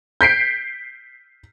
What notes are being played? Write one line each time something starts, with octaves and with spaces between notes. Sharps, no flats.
G6 B6 C7 D7